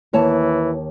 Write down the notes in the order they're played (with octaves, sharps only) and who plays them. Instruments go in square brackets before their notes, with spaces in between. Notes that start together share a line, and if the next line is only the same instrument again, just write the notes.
[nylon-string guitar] D#2 C#5 A5 [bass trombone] E3